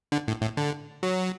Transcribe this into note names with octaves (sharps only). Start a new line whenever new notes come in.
D3
A2
A2
D3
F#3